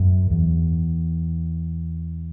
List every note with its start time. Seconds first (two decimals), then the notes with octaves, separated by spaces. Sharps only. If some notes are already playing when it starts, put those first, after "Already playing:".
Already playing: F#2
0.31 E2